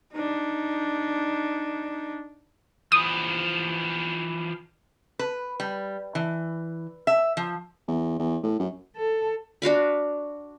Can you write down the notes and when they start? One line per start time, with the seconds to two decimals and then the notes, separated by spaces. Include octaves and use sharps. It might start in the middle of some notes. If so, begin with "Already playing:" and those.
0.13 D4 D#4
2.92 E3 F3 D#6
5.19 B4
5.60 G3
6.15 E3
7.07 E5
7.37 F3
7.88 E2
8.19 E2
8.43 A2
8.60 F#2
8.96 A4
9.62 D4 F#4 F5 B5